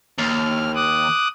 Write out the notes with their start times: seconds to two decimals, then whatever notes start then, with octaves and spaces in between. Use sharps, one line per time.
0.18 D#2 F6
0.75 D6 D#6 F#6